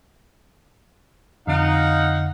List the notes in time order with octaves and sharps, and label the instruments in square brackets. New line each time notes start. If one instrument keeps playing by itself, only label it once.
[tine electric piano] F2 D3 [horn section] D#4 F5 F#5